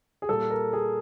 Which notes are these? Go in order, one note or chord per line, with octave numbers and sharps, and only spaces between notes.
G#4
A#2 G3 A#3 A4
A#4
G#4